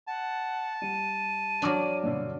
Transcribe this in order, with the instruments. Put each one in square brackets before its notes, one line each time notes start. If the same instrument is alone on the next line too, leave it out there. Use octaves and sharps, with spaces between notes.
[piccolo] F#5 [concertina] A5
[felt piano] G3 [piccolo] D#7
[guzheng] F#3 D4 [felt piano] C#6 D6 F6
[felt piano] G2 B2 D3